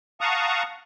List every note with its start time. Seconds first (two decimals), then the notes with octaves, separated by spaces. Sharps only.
0.21 F5 F#5 A5 A#5 C#6 D#6